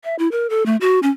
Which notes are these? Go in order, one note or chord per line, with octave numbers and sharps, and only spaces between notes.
E5
E4
A#4
A4
A3
F#4
C#4